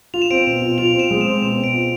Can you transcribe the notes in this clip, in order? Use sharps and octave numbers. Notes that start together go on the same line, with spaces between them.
F4 F7
E7
C4 D7
E7
B2
F4
F4 F7
C4
E7
G#3
C4 E7
B2 E7
C4
D7
F4